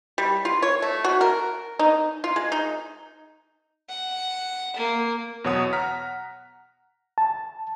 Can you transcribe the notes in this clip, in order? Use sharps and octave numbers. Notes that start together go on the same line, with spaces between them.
G3
F4
C#5
A3
F#4
A#4
D#4
F4
G#3
D#4
F#5
A#3
E2 B2 F#3 C#5 F#5 D#6
F#5 A#5 F6 B6
A5